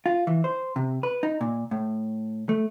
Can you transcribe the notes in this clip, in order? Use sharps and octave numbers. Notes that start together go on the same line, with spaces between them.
F4
E3
C5
C3
B4
D#4
A#2
A2
A3